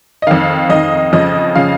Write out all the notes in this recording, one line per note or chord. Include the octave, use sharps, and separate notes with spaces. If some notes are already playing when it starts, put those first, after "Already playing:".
D#5
F2 D#3 F5
F2 D#3 D#5
F2 C#3 F3 D#5
C#3 F3 F5